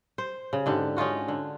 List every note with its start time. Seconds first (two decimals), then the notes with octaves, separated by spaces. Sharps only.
0.18 C5
0.53 C#3
0.66 G#2 D3 G4
0.97 C#4 D#4 F4 F#4
1.28 D3